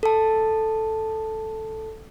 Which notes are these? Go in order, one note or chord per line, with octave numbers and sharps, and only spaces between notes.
A4 A5